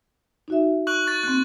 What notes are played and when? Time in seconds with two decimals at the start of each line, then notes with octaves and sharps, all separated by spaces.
0.48 D#4 F#4 E5
0.87 C#6 F#6 F#7
1.07 C#6 A6
1.23 A#3 C4 F#6